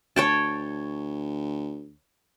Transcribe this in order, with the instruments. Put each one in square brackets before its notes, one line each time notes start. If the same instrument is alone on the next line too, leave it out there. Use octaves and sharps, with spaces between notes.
[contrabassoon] D2 [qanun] C#5 G5 A5